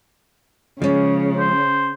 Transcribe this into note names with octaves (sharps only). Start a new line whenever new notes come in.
C#3 F3 G#3 C#4 D5
C5